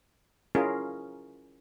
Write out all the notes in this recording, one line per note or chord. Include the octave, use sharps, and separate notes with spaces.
C#4 E4 F4 G#4 A#4